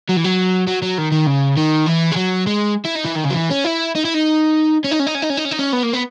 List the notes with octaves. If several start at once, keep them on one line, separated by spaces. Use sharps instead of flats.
F#3
E3
F#3
F#3
F#3
D#3
D#3
C#3
D#3
E3
G#3
F#3
G#3
E4
D#4
E3
D#3
C#3
F#3
E3
C#4
E4
D#4
E4
D#4
C#4
D#4
C#4
D#4
C#4
D#4
C#4
D#4
C#4
D#4
C#4
B3
A#3
B3